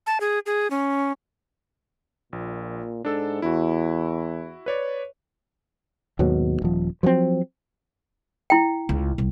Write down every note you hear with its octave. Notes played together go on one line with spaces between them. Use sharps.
A5
G#4
G#4
C#4
A#1 A#2
G#2 D4 A4 E6
E2 E4 F#4
B4 C#5 D5
D#2 G#2 B2 F#3
D#1 F3
F3 F#3 A3 C4
E4 G5
C#2
C2